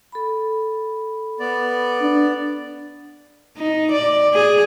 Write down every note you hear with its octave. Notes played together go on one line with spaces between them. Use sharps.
A4 B5
B3 D5
D4
D#4
D5
G#4